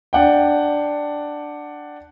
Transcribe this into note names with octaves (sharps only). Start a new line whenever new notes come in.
D4 F#5 G5